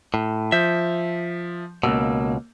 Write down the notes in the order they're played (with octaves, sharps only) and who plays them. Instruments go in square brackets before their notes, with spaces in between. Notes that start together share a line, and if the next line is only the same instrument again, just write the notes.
[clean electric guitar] A2
[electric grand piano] F3 G6 [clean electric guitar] E5
[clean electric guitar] C#2 G#2 B2 [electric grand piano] A#3 E6